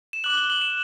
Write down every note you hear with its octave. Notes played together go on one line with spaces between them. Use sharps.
E7
D6 F#6 F#7
G7
F#7
E7